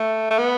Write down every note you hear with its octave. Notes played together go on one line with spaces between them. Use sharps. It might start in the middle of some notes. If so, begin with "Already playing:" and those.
Already playing: A3
A3
B3